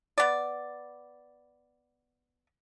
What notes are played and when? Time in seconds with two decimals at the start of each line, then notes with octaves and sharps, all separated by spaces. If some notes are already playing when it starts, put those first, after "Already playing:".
0.18 B3 D5